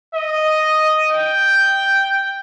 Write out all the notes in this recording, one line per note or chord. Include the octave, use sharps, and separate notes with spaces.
D#5
G5